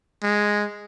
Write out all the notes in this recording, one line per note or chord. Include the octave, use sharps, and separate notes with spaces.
G#3